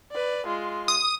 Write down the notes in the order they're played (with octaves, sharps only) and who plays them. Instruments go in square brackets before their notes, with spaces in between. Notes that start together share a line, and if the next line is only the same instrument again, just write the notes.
[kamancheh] B4 D5
G#3 F4
[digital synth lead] D#6